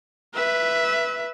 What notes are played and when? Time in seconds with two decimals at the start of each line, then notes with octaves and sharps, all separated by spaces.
0.35 B4 E5